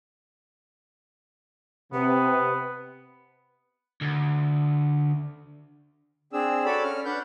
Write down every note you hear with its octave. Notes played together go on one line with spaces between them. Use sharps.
C3 B3 B4
D2
C4 D4 G#4 E6
F#4 A4 C#5 D5 B5 E6
C#4 F6
D4 B4 F#5 G6